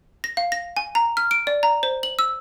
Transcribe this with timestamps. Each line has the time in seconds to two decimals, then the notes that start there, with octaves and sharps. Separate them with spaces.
0.24 A#6
0.37 F5
0.52 A#6
0.77 G#5
0.95 A#5
1.17 F6
1.31 D7
1.47 D5
1.63 A#5
1.83 C5
2.03 F#7
2.19 E6